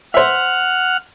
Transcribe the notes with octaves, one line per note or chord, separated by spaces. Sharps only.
C5 E5 F#5 F6 F#6